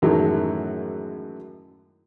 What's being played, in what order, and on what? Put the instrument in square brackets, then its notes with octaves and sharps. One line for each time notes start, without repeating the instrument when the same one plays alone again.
[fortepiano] F#2 A2 D#3 E3 F#3 G#3